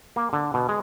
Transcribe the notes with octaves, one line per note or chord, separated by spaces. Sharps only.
A#3
D3
B2
G#3